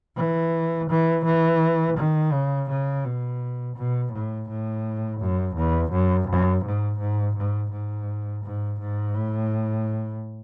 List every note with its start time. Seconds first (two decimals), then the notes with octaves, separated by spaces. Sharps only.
0.17 E3
0.90 E3
1.25 E3
1.97 D#3
2.33 C#3
2.69 C#3
3.05 B2
3.76 B2
4.12 A2
4.49 A2
5.20 F#2
5.56 E2
5.92 F#2
6.28 F#2
6.64 G#2
6.99 G#2
7.36 G#2
7.72 G#2
8.44 G#2
8.80 G#2
9.15 A2